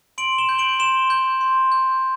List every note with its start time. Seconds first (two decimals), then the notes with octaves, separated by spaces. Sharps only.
0.18 C6 D7 F#7
0.38 E7 G7
0.49 G6
0.58 D7 F#7
0.79 C6 E7 G7
1.10 G6
1.41 C6
1.72 G6